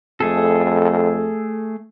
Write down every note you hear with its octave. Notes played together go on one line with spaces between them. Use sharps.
F2 A3 G#4 A4